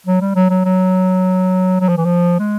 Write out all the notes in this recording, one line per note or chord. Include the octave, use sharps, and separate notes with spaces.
F#3
G3
F#3
F#3
F#3
F#3
F3
E3
F3
G#3